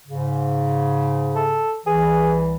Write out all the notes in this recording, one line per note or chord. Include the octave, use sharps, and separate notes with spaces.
G#2 C#3
A4
C2 E3 G#4